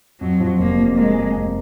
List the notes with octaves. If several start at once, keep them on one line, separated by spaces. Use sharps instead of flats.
F2 F#3
F3
F1 A#3
F2
G#3 A#3
F2
F2